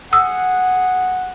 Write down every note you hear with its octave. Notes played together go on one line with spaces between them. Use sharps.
G#4 F#5 D#6 E6